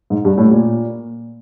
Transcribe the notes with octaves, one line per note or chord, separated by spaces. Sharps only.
G#2
G2
A2
A#2